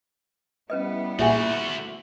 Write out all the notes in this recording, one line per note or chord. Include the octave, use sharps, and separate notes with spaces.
G3 B3 C#4 E4 B4 D#5
A#2 A3 F#4 G#4 E5 F#5 G#5